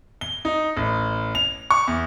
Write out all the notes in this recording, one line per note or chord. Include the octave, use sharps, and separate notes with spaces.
G7
D#4
A1
F7
C#6
E2